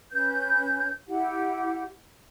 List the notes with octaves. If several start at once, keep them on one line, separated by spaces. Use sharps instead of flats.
C#4 B4 G6
E4 G4 F#5